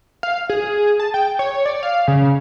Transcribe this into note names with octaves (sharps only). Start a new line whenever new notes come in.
F5
G#4
A5
G5
C#5
D5
F5
C#3